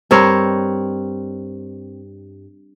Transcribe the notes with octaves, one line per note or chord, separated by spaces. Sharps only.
G2 C4 A#4 C#5